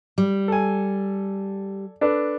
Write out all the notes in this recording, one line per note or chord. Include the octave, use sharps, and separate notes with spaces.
G3
A4 G#5
D4 A4 B4